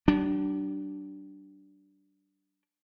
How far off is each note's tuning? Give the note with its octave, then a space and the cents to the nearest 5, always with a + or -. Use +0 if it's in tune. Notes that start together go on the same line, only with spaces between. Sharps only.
G3 -45 D4 +0